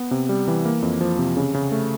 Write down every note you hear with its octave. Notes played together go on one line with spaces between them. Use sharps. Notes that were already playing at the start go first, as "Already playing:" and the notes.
Already playing: B3
C3
G3
E3
A#3
F2
F3
C3
C#3
C#3
A3